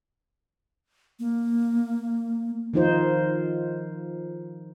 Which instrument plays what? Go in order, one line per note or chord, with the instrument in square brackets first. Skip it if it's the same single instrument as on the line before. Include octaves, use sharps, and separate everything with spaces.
[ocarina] A#3
[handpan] D#3 F3 D#4 F4 C5